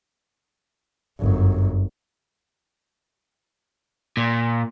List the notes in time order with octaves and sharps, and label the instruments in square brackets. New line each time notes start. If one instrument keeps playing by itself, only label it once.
[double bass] G1 F#2
[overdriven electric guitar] A#2